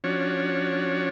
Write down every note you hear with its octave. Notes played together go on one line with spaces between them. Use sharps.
F3 C#4 D4 F#4 C#5